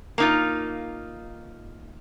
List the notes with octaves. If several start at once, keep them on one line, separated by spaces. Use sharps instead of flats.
A#3 D#4 F4